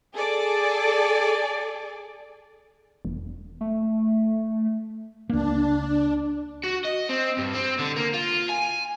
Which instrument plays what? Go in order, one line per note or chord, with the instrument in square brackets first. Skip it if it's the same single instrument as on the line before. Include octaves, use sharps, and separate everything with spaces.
[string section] G#4 A4 D5
[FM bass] E1
[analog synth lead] A3
[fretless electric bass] C#2 A#3 [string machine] D4
[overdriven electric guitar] F#4
D#5
C4
G2
C4
D3
A#3
F4
G#5